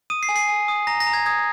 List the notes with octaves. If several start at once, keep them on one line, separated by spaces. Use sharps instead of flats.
D#6 D#7
C7
G#5
C7
G#5
D#6
A#5 A#6
A#6
A#5
G#6
D#6 G#6